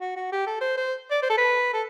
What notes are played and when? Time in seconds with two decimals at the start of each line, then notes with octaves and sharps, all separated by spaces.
0.01 F#4
0.16 F#4
0.32 G4
0.47 A4
0.61 C5
0.77 C5
1.11 D5
1.22 C5
1.30 A4
1.38 B4
1.73 A4